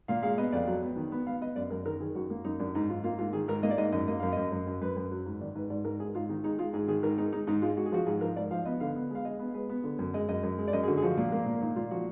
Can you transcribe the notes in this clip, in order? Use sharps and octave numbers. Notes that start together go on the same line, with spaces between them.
A#2 F5
G#3 F5
B3 D#5
F2 D5
F#3
B3
D#3
B3
B3 F5
B3 D#5
F#2 D5
F#2 A#4
D#3 A#4
D#3 G#4
F#2 F#4
A#3
F#2 D#4
F#2 D4
G#2 D#4
G#2 F4
A#3 F4
G#2 F4
D#3 G#4
G#2 A#4
A#3 D#5
D5
G#2 D#5
F#2 D#5
A#3 D#5
F#2 F5
F#2 D#5
F#2
F#2
F#2 B4
F#2
F#3
G#2
D#3 D5
G#2 B4
G#2 D5
G#2 A#4
G#2 G#4
G#2 F4
D#3 D#4
G#3 D#4
G#3 F4
G#2 G#4
D#3 G#4
G#2 A#4
G#3 D#4
G#3 D#4
G#2 D#4
G#3 F4
G#3 F#4
G#4
F3 F#4
G#2 G#4
F3 A#4
G#2 D5
F3 F5
B3 D#5
D3 F5
B3
G#3 F5
G#3 D#5
B3
G#3 B4
B3
D3
F#2
G#3 D#5
F#2 D#5
F#2
G#3
D5
F#2 D#5
G#4
D3 F#4
G#4
F3 F#4
A#2
A#3
A#2
A#2 D#4
A#2 F4
F3 F#4